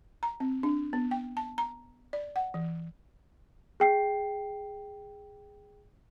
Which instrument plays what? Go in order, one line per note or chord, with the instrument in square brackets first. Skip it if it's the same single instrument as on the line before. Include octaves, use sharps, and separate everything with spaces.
[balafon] A#5
C4
D4
B3
G5
A5
A#5
D5
F#5
E3
[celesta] G#4 G5 C7